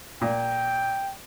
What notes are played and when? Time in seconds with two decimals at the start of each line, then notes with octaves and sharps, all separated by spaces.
0.21 A#2 G5